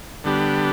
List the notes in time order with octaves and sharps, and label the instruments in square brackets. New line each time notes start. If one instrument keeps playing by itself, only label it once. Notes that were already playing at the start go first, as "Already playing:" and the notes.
[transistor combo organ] D3 G3 B3 D4 G4